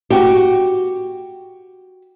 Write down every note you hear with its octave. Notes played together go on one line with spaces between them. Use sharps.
F#4 G4